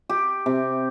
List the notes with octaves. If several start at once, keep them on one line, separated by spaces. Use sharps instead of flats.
G4
C3